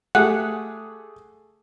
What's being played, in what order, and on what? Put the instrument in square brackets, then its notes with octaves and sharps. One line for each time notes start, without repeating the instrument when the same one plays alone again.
[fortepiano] A3 G4 G#4 [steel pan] F#5